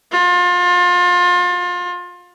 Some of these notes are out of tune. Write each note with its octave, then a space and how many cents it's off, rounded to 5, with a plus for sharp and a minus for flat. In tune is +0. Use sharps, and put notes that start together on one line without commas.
F4 +30